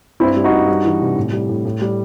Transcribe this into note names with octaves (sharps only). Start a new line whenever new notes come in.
G2 C4 E4
G3
D#4 F#4
G2
G3
E3
C2
A2
G3
A2
A2
G3